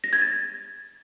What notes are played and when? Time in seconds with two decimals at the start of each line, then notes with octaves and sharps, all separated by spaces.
0.04 A#6
0.13 G#6
0.22 A6